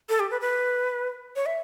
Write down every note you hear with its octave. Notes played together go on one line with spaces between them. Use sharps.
A4
G4
B4
B4
C#5
E5